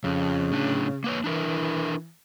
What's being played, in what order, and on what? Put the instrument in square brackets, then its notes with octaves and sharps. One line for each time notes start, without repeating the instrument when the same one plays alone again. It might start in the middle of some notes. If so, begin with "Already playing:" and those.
[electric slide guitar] F2 [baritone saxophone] C#3
[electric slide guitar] A2 D4
A#3 B4 C#5
[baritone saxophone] E3 [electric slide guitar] D4 E4 A#4